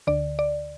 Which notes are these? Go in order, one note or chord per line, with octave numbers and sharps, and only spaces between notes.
D2 D3 D5
D5